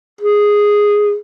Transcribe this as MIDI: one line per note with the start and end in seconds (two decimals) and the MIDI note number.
0.21 1.16 68